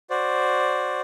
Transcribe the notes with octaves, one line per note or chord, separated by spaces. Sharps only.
F#4 C5 D5